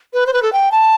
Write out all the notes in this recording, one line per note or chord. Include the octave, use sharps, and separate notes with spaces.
B4
C5
B4
A4
G5
A5